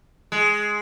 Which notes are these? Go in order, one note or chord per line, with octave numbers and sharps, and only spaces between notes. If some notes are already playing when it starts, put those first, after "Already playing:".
G#3